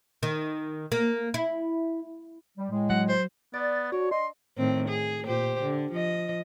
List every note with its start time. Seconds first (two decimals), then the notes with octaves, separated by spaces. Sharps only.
0.23 D#3
0.92 A#3
1.34 E4
2.58 G3
2.70 A2 G#3
2.90 F#3 F#5
3.09 C5
3.54 B3 D5 A6
3.92 D4 F#4 C#5
4.11 D#5 C6
4.57 A2 D#3 C4
4.89 G#4
5.26 A#2 G4 C5
5.62 D3
5.92 F3 D#5